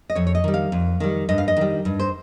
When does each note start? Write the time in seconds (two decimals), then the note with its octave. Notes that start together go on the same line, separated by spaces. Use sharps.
0.10 D#5
0.15 F2 C#5
0.27 C#5
0.35 D#5
0.44 D#3 G3
0.54 F5
0.72 F2
1.00 D#3 G3
1.29 G2 D#5
1.38 F5
1.48 D#5
1.57 D#3 G3
1.85 G2
2.00 C5